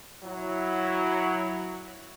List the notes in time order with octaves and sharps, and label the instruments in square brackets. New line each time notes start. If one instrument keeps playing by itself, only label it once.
[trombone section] F#3 E4